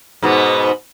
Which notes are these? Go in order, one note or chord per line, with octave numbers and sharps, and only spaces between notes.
G#2 B2 B3